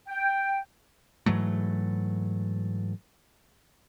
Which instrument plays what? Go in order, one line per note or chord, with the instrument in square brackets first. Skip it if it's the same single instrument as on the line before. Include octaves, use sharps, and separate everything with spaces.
[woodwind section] G5
[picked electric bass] G#2 E3 F#3 A3